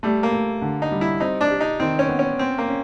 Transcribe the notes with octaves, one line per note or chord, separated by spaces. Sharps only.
G3 A3
A#3
A3
D3
D#4
G3
E4
C4 D#4
D4
G4
D#4
D#3 C4
C#4
B3
C#4
C4 C#4
A#3
C#4